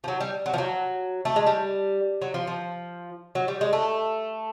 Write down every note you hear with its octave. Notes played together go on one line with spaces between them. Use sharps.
F3
F#3
G3
F#3
F3
F#3
A3
G#3
G3
F#3
F3
F3
F#3
G3
G#3
A3